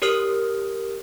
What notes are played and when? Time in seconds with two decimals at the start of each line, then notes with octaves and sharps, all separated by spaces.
0.02 G4 A#4 C#5 D#6 F6